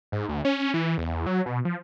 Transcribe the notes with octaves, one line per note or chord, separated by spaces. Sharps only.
G#2
D2
C#4
E3
E2
F#3
B2
F3